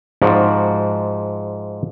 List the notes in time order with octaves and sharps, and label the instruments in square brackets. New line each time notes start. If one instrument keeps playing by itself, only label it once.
[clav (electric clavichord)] G#2 F3 F#4 D5